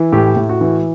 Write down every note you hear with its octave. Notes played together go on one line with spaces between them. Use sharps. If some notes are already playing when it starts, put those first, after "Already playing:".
Already playing: E3
A2 G4
A2
F#4
E3